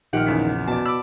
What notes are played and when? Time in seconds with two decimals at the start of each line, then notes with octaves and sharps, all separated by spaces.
0.13 A#1 D#3 G4 F#5 F6 D7
0.27 E2 C#3 B6
0.67 B2 D5 A5
0.86 B5 D6 E6